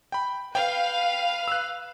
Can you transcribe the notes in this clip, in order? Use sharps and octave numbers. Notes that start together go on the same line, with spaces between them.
G5 B5
B4 F5 G5
E6 F#6